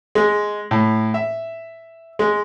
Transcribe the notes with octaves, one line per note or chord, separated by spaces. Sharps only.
G#3
A2
E5
G#3